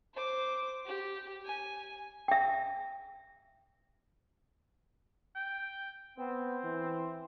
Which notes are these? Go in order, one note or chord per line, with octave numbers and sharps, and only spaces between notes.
C5 D6
G4
G#5
E5 G5
G5
B3 C4
E3